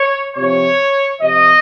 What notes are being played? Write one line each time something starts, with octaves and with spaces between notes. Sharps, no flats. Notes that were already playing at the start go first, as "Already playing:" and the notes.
Already playing: C#5
C3 F3 C#5
C3 F3 D#5